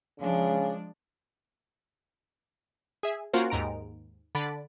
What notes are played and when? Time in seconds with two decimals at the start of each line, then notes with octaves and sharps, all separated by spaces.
0.20 C#3 F3 G#3 D4
3.03 G#4 E5
3.33 A#3 C#4 F4 F#4 A#4 C5
3.50 D#2 G#2 A#5 D7
4.35 D3 B5 A6 D7